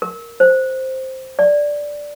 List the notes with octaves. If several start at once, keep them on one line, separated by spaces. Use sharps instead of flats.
A#4
C5
D5